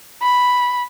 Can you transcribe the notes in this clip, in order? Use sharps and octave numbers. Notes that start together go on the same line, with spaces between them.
B5